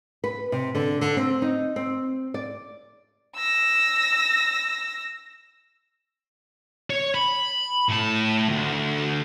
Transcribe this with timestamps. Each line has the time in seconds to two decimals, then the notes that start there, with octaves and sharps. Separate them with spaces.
0.24 B4
0.52 C3
0.75 D3
1.01 D3
1.17 C4
1.42 D#4
1.76 C4
2.34 D5
3.37 E6 A#6
6.90 C#5
7.15 B5
7.90 A2 A5
8.49 D2